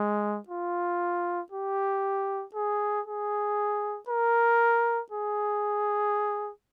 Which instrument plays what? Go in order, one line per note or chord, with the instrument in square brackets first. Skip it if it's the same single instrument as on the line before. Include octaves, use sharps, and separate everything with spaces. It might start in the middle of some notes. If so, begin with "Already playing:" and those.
Already playing: [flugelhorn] G#3
F4
G4
G#4
G#4
A#4
G#4